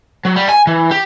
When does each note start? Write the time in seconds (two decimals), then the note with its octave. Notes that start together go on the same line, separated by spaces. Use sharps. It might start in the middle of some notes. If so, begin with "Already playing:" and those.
0.25 F#3
0.36 G3
0.49 G#5
0.67 E3
0.91 G4